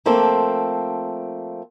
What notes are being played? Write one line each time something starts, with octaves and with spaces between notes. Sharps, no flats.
F3 A3 A#3 C4 A4